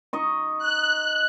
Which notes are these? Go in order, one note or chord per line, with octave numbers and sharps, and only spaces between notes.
D#4 D#5 C#6
F#6